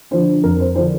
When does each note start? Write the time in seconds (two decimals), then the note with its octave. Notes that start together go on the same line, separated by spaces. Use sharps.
0.11 D3 F3 D4 C5
0.44 F2 A#4
0.60 C5
0.75 D3 F3 D4 C5